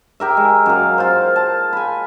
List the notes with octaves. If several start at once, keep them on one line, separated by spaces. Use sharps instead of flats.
G4 A#4 E5
G#3
F#2 F5
F4 C5
A5
G#5 B5